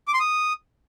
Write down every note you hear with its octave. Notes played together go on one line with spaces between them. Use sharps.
D6
C6
D#6